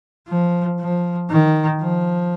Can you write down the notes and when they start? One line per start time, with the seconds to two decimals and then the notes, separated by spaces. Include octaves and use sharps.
0.28 F3
0.79 F3
1.30 D#3
1.82 F3